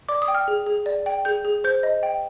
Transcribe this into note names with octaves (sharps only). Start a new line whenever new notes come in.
D5 D6
D#6
G5
F6
G#4
G#4
D5
G5
G#4 G6
G#4
C5 G6
D#5
G5